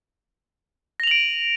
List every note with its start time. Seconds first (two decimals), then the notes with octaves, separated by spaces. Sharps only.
1.00 A#6
1.03 F7
1.07 F#7
1.11 D7
1.15 D#7